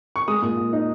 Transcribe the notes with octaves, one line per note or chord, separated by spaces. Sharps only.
C#6
G#3 D#6
A#2
A#2
D#4